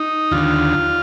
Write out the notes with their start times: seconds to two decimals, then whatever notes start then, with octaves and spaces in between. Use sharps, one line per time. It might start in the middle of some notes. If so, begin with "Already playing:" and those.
Already playing: D#4
0.31 D#2 D3 F4